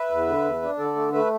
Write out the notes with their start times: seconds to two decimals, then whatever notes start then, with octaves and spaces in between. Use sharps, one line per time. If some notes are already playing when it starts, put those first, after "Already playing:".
Already playing: B4 E5
0.11 E2
0.27 D3
0.44 E2
0.62 D4
0.78 D3 A4 D5
0.96 A3
1.12 A3 B4 E5